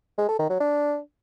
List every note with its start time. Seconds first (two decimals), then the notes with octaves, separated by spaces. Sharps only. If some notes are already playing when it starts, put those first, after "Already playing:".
0.18 G#3
0.29 A4
0.39 D#3
0.50 F#3
0.60 D4